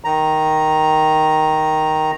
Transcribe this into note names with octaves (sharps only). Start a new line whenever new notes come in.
D#3 A#5